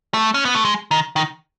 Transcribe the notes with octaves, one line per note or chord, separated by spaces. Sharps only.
A3
C#4
B3
A3
G#3
D#3
D#3